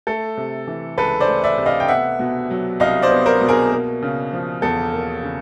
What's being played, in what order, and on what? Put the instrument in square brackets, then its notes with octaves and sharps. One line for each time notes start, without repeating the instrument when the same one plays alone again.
[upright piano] A3 A4
C3
E3
C#2 A4 B4
C5 D5
A3
D5 E5
C3
D#5 F5
G5
B3 E5 F#5
B2
F#3
C2 D#5 F5
C5 D5
B3
A#4 C5
B2
G#4 A#4
A#3
C#3
F3
E2 A4
A#3
C#3